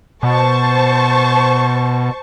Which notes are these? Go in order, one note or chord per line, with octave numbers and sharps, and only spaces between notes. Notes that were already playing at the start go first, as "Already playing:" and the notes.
B2 C5 A5 C#6